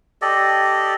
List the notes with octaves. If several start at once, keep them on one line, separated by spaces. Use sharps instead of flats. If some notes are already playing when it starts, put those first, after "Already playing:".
G4 A4 D5 D#5